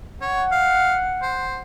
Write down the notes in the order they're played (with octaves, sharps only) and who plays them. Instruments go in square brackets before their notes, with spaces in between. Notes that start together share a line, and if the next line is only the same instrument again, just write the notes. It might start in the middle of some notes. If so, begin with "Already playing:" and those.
[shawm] C#5 [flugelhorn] F#5
[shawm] F5
C5